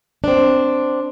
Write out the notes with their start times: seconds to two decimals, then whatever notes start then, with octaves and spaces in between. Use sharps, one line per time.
0.24 C4 D4